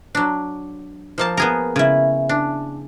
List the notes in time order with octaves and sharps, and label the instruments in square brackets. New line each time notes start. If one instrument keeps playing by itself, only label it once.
[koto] F#3 D4
F3 A#3 A5
[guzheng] B3 G#4 A#4 [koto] A#5
[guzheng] C#3 E4
[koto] D4